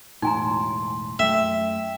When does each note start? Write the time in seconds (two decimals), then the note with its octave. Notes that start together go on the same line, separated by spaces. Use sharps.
0.22 E1 A2 D#4 G#5 A#5 C6
1.19 F#2 A3 E5 G5